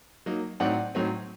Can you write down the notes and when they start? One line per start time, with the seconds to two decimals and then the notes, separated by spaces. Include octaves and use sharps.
0.26 F#3 A#3 D#4
0.60 A2 F#3 C4 D#4 D5 F#5
0.95 A2 F#3 C4 D#4